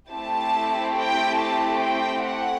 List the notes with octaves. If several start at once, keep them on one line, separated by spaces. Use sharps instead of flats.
A3 C4 E4 G4 A5
G5
A5
G5
F#5